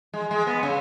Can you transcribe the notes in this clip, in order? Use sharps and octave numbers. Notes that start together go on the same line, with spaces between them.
G#3
G#3
B3
C#3